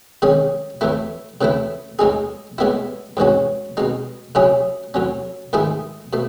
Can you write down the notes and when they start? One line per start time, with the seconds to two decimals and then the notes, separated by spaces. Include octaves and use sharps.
0.22 D#3 G#3 C#4 G#4
0.81 A2 E3 A3 E4
1.41 C#3 E3 A3 E4
1.99 A2 G#3 D#4 G#4
2.58 A2 G#3 B3 E4
3.17 G#2 E3 G#3 C#4 F#4
3.77 B2 G#3 D#4
4.35 C#3 F#3 C#4 E4 G#4
4.94 A2 F#3 C#4
5.53 G#2 D#3 A3 E4 G#4
6.13 B2 A3